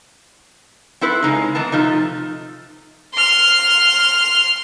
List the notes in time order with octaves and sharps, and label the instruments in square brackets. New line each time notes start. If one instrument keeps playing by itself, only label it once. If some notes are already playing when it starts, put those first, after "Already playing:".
[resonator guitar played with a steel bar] C4 E4 A4 B4
C#3 G#3 D#4
D#3 E3 B3 A5
C3 F3 A3 D#4
[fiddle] C6 F6